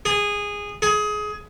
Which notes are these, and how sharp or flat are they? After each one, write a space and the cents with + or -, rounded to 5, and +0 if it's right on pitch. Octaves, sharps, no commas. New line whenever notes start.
G#4 -15
G#4 +20